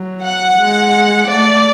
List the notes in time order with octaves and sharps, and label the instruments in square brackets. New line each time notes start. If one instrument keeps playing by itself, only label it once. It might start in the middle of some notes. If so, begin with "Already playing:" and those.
Already playing: [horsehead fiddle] F#3
[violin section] F#5
[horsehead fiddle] G#3
[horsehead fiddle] A3 [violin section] D5